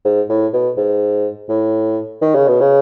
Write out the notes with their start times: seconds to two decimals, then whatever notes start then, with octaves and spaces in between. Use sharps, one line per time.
0.05 G#2
0.30 A2
0.53 B2
0.77 G#2
1.49 A2
2.22 D#3
2.35 C#3
2.48 B2
2.61 C#3